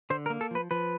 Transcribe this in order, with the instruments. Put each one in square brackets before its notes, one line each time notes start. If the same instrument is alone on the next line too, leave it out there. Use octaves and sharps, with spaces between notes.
[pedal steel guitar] D3 C5
A#4
A#3
A4
F3 B4
F3 B4